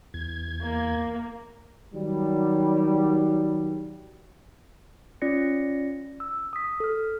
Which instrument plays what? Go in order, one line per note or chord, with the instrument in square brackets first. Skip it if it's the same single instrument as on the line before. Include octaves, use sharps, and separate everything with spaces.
[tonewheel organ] E2 G#6
[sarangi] A#3
[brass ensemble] D#3 F#3 G3
[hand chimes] C#4 F4 D5 A#6 C#7
E6
D#6 B6
A4 F6